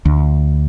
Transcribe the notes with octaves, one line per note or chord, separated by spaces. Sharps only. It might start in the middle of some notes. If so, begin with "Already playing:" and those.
D2